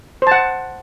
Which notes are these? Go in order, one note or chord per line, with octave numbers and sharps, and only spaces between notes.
C5 F#5 A5